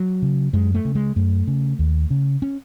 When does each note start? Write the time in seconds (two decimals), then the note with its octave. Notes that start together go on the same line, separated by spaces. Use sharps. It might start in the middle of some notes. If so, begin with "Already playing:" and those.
Already playing: F#3
0.22 C#3
0.53 F#2 G#3
0.75 A3
0.85 C#3
0.95 G#3
1.16 F#2 A3
1.47 C#3
1.79 D#2
2.10 C#3
2.42 C#4